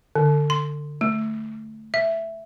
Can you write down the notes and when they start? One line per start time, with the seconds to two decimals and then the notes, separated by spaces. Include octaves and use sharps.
0.15 D3
0.50 C6
1.01 A3
1.94 E5